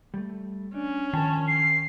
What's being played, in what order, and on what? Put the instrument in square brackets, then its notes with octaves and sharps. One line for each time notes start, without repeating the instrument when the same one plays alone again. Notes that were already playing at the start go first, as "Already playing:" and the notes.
[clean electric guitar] G3 A3
[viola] C#4 [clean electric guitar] D4
[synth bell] D#3 [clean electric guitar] F3 A#4 [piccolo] A5
[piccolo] C7